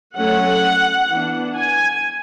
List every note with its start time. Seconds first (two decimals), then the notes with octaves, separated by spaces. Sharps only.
0.16 F#3 A3 C#4 F#5
1.11 E3 B3 D4
1.57 G#5